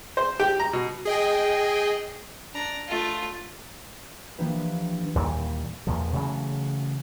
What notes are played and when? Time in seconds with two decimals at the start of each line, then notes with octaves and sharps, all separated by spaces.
0.17 C5
0.40 G4
0.60 A#5
0.73 B2
1.05 G#4 D#5 G5
2.54 D4 A#5
2.88 A3 F4
4.38 E3 F3 A#3 D4 G4 B4
5.15 D#2 A#2 E3 G3
5.87 E2 A#2 F3
6.13 C#3 E3 F#3 A3